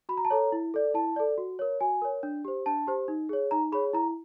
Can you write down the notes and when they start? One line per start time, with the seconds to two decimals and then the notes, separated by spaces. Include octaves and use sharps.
0.09 F#4 B5
0.17 A#5
0.25 A5
0.30 A4 C#5 A#5
0.52 E4
0.74 A4 D5
0.94 E4 A5
1.16 A4 D5
1.38 F#4
1.59 A#4 C#5
1.81 F#4 G#5
2.02 A#4 C#5
2.23 D4
2.45 G4 C5
2.66 D4 A5
2.87 G4 C5
3.08 D#4
3.29 G#4 C#5
3.51 D#4 A#5
3.72 G#4 C#5 B5
3.93 E4 A#5